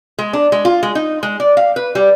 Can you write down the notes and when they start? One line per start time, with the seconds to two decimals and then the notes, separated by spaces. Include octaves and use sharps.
0.19 G#3
0.33 D4
0.52 G#3
0.65 F4
0.83 G#3
0.95 D#4
1.23 G#3
1.40 D5
1.57 F5
1.76 B4
1.95 G3